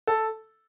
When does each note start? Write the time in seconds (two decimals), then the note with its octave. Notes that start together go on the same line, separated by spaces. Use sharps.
0.07 A4